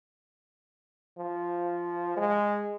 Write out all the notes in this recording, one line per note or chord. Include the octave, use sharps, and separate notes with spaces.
F3
G#3